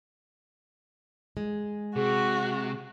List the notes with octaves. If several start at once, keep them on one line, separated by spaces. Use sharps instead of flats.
G#3
C3 F#4 G#4